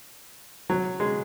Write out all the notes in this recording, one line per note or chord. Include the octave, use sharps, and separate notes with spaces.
F#3
G#3